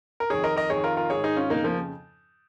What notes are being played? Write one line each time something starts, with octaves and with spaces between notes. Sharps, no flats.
A#4
F2 D#3 G#4 C#5
A#4 D#5
A#4 D#5
F2 D#3 G#4 C#5
F4 A#4
F4 A#4
G#2 D#3 G#4 C#5
D#4 G#4
C#4 F4
F2 C#3 A#3 D#4
F3 A#3